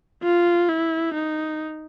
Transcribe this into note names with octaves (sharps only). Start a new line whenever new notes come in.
F4
E4
D#4